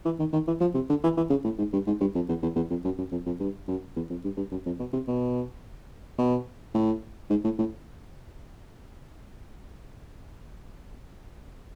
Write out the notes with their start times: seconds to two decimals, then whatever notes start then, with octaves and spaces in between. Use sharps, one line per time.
0.05 E3
0.19 D#3
0.33 D#3
0.47 E3
0.61 F3
0.74 C3
0.89 D3
1.03 E3
1.17 E3
1.30 C#3
1.44 A2
1.58 G#2
1.73 G2
1.87 G#2
2.00 G2
2.15 F2
2.29 E2
2.42 E2
2.55 E2
2.70 F2
2.85 F#2
2.98 F#2
3.11 F2
3.26 F2
3.40 G2
3.68 F#2
3.96 E2
4.10 F2
4.24 G2
4.37 G2
4.51 F#2
4.66 F2
4.80 B2
4.93 C3
5.07 B2
6.18 B2
6.74 A2
7.30 G#2
7.44 A2
7.59 A2